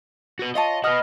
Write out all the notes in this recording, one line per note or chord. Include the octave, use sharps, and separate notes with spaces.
F#4 B4
F4 C#5 D#5 A5
F#4 B4 D#5 D#6 F6